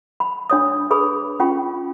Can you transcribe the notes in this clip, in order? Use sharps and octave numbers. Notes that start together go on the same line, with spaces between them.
B5
D4 C#5 D#6
G#4 B4 B5 D#6
C#4 F4 G5 B5 C#6